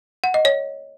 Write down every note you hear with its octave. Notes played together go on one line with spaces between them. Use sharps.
F#5
D#5
C#5